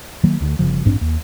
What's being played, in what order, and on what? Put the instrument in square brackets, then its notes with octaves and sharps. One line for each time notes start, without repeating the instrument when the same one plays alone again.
[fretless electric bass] D#3 F#3 A#3
D2
G1 C2 C#3 F3
A1 G2 C4 D4
D#2